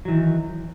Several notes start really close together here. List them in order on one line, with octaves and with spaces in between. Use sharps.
F#3 E3 D#3